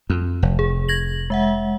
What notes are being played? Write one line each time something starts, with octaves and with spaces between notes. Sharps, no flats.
F2
F1
G#4
G#6 A#6 F#7
G#3 E5 F#5